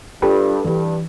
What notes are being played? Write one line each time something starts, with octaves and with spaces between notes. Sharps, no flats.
G2 F4 G4 A4 B4
G2 E3 E4